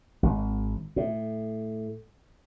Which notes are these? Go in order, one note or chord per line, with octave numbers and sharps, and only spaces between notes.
G#1
A2